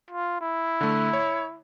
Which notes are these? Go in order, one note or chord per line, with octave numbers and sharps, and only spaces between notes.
F4
E4
D3 A3
C#5